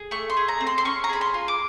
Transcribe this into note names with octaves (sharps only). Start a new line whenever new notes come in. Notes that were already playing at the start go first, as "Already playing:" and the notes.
Already playing: G#4
A3 C#6
C6
G#4
A#5
C4
C6
C6
C#4 C#6
A#5
G#4 B5
C6
F4
D6